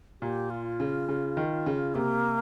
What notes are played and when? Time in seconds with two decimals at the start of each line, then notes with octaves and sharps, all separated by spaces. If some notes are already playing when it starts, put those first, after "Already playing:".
0.21 A#2 G4
0.50 F4
0.80 C#3
1.09 C#3
1.37 D#3
1.66 C#3
1.95 C3 A#3